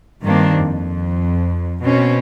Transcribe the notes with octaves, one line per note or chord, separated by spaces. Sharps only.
G2 D#3 A#3 C4 D4
F2
B2 C4 C#4